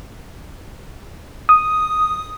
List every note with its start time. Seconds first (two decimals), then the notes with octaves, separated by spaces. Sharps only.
1.49 D#6